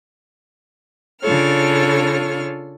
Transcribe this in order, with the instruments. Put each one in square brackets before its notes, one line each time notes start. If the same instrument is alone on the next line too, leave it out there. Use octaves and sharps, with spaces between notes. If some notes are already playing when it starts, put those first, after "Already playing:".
[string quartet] C#3 D4 F4 A4 C#5 F6